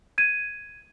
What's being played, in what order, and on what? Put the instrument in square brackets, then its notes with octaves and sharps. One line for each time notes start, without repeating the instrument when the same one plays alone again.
[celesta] G#6 D#7